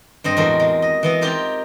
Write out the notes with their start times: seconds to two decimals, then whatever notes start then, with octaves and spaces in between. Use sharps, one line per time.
0.24 G2 C4 D#5
0.37 E2 A2 G#3 F#4 A#4 C5
0.60 G#3
0.82 D#5
1.03 E3 B3 D#5
1.21 C4 D#4 F4 G4 A#4 C5